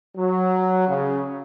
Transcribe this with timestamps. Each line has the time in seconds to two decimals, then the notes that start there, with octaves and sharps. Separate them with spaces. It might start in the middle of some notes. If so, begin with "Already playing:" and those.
0.16 F#3
0.88 C#3